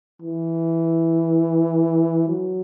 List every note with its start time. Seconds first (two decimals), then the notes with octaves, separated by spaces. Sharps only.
0.22 E3
2.29 F#3